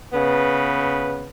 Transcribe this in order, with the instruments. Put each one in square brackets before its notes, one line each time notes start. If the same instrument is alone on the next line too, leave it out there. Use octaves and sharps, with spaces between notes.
[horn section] C#3 B3 B4